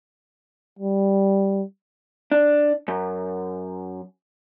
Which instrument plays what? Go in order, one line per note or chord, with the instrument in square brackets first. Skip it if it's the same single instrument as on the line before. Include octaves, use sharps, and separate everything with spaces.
[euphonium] G3
[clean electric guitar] D4
F#2